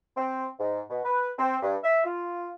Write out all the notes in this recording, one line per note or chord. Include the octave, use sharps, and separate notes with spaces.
C4
G#2
B2
B4
C4
G2
E5
F4